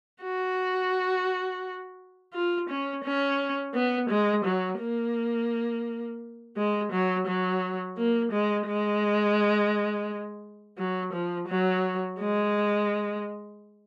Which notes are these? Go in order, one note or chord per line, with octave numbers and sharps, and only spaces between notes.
F#4
F4
C#4
C#4
B3
G#3
F#3
A#3
G#3
F#3
F#3
A#3
G#3
G#3
F#3
F3
F#3
G#3